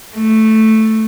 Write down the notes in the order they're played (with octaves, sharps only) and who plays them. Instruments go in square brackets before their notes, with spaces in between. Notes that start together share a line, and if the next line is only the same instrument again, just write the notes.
[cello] A3